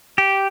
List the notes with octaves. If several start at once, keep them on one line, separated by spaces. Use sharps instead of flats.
G4